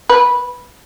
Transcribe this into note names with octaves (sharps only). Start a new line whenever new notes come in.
B4